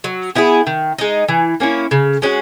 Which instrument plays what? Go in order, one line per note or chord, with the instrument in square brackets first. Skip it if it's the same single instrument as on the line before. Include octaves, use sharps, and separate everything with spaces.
[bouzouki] F#3
B3 E4 G#4
D#3
G#3 D#4
E3
A#3 C#4 E4
C#3
G#3 C#4 F#4